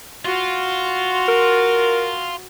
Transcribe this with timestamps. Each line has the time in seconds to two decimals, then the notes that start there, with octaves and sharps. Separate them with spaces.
0.25 F4 F#4
1.28 A#4